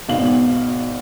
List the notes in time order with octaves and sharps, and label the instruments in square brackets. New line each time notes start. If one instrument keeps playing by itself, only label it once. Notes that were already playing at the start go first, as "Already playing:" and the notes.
[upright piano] G#1 B2 F5 F#7